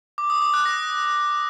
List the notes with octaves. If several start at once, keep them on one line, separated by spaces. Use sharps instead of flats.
D6
D#6
D6
F#6
A#6